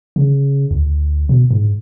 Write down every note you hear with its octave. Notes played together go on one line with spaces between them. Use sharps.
C#3
D2
B2
G#2